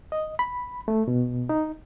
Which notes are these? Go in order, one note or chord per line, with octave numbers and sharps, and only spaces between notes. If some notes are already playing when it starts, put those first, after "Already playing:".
D#5
B5
A3
B2
D#4